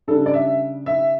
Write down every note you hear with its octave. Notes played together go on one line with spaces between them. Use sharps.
C#3 G3 D4 A4
D5
E5
E5